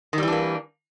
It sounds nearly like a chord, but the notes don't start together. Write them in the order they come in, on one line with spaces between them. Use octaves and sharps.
D#3 G3 E3 D4 A#3